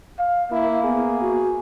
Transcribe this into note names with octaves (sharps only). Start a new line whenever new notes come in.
F5
A#3 E4
B3 G#4
F#4